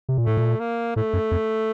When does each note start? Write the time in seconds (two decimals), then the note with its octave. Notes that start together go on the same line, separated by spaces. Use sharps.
0.09 C3
0.18 A#2
0.26 A2 A3
0.37 A#2
0.60 A#3
0.96 A2 A3
1.13 F#2
1.31 F2